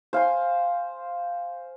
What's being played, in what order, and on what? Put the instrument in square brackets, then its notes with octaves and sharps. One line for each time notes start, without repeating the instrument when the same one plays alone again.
[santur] C5 F5 G#5 C6